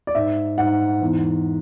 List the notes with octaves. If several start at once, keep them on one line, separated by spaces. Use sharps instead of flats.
D5
G#2 E5
G#2 F#5
E2